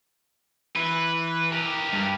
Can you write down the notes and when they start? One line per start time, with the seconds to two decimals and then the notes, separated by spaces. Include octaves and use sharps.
0.76 E3 B4
1.53 G4 A#4
1.93 G2